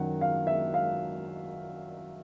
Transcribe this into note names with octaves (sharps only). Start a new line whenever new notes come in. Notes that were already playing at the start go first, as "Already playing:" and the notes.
Already playing: F#2 D#3 F#3 F#5
F5
E5
F5